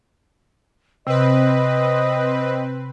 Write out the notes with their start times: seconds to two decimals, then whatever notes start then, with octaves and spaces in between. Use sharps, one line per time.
1.07 C3 C4 B4 D#5